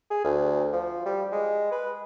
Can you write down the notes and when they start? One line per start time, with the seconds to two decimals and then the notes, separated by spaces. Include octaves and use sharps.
0.10 G#4
0.24 D2
0.73 F3
1.05 G3
1.32 G#3
1.71 B4